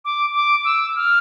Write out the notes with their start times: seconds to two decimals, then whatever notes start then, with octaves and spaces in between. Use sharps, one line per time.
0.05 D6
0.35 D6
0.65 E6
0.96 F6